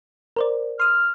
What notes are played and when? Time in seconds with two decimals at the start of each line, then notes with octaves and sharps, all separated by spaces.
0.36 A#4 C5 D5
0.80 C6 D#6 F6